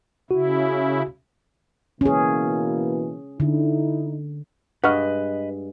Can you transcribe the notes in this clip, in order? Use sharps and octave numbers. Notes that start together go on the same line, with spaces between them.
C#3 E4 F#4
B2 E3 A#3 C#4 G#4
D3 D#4 E4
G2 G#3 B4 D#5 F#5 C#6 F6